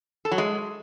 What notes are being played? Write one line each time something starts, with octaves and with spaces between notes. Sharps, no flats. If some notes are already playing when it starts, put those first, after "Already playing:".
A4
F#3
G#3